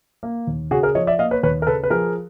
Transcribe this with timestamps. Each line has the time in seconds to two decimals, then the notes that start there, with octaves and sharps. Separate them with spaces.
0.23 A#3
0.47 D#2
0.71 C#3 F#4 G#4
0.83 G#4 A#4
0.95 F3 C#5 D#5
1.07 D5 E5
1.19 A#3 D#5 F5
1.31 B4 C#5
1.43 D#2 B4 C#5
1.62 A#4
1.67 C#3 A4 B4
1.84 B4
1.90 F3 G#4 A#4